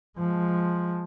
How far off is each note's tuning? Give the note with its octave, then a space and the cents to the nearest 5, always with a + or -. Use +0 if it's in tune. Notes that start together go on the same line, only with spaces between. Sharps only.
F3 +0 G#3 +0